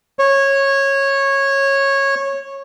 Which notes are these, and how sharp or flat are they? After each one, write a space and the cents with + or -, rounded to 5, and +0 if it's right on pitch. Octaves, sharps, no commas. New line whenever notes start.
C#5 -15